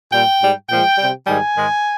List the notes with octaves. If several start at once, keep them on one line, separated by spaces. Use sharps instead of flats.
A#2 G3 G5
G#2 G3
A#2 F3 G#3 G5
C3 G3
G#2 D#3 G3 G#5
G#2 D#3 G#3